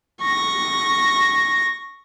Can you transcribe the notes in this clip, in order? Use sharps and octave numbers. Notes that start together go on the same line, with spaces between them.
C#6 A#6